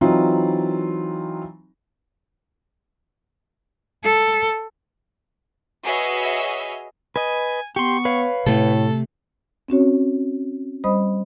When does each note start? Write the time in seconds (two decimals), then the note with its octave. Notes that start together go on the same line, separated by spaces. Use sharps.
0.01 E3 F#3 C4 D#4 F4
4.04 A4
5.83 F#4 G#4 B4 C#5 D#5 E5
7.16 B4 D#5 G#5
7.76 B3 G4 C6 C#6
8.05 B4 C#5 F5
8.46 A2 C3 A3 A4
9.68 C4 C#4 F#4 C#5
10.84 G3 C5 D#5 B5 D#6